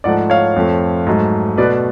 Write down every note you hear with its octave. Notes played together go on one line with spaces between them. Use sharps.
G#2 F3 A3 D5 F#5
C#5 F5
F2 F3 A3
G#2 F#3 A3
B2 A3 B4 D5